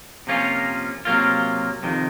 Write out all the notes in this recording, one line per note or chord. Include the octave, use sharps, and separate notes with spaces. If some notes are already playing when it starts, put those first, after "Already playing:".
C3 F3 A#3 C#4 F4
C3 F#3 A#3 F4
F2 C3 D#3